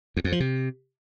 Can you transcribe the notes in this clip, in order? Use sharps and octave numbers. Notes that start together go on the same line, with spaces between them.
E2
F2
F3
C3